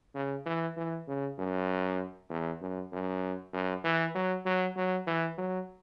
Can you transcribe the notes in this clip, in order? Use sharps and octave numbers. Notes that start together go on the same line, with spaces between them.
C#3
E3
E3
C#3
F#2
E2
F#2
F#2
F#2
E3
F#3
F#3
F#3
E3
F#3